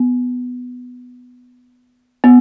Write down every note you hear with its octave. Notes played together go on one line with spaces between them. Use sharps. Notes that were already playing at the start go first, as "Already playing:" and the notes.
Already playing: B3
B3